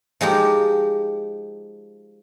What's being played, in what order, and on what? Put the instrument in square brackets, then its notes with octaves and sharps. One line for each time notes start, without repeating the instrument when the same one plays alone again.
[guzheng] F3 G#3 D#4 G4